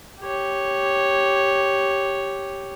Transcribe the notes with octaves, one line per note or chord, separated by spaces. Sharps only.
G4 C#5